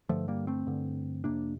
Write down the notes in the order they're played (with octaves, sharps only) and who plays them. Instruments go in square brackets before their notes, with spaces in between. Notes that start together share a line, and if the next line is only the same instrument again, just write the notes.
[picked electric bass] G2 D3 F3 A3
G3 A#3
A3 C4
G2 D3
F2 C3 A#3 D4